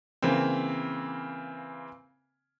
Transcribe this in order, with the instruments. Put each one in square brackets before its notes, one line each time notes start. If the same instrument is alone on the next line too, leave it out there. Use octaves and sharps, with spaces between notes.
[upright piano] C#3 E3 A#3 C4